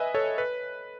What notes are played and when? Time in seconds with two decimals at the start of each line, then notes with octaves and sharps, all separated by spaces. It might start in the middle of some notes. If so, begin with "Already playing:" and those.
Already playing: B4 D#5 E5 G#5
0.15 A4 C#5
0.38 B4